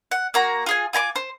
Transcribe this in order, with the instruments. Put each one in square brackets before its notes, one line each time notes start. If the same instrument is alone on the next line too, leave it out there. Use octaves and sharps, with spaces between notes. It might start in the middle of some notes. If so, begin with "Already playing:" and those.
[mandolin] F#5
A#3 F#4 A#5
F4 G#4 G#5
F4 G#5 A#5 D6
C5